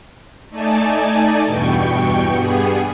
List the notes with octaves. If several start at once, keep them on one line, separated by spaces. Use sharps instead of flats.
A3 D#4 D5 G#5 A5
E2 G2 B2 G5 C#6
G2 G3 B3 G#4